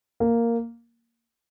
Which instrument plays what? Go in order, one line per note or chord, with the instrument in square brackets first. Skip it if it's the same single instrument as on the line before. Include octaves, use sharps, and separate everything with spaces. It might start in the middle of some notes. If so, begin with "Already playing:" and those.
[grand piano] A#3